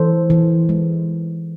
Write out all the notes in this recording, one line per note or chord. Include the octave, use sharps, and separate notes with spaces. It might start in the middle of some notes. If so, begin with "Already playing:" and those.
Already playing: E3 A4 C5
E3
G#3